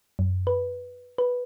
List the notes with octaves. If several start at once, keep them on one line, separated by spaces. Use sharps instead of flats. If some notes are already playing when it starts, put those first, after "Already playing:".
F#2
B4
B4